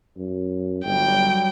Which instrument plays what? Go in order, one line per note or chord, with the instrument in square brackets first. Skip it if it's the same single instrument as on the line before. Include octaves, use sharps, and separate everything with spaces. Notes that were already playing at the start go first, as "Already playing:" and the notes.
[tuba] F#2
[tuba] G1 [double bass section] F#3 G3 [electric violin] G5